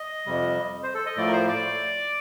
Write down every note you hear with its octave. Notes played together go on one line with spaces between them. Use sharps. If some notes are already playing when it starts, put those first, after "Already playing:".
Already playing: D#5
F2 C3 G3
C5
A4
D#5
A2 F3 A3 D5
A#4
C5
D5